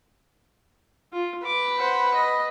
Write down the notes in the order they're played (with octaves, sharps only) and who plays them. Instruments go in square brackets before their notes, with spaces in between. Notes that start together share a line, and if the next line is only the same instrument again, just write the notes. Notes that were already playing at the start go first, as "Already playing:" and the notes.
[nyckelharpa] F4
[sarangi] B4 [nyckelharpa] D6
[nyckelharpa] C5 F#5
D#5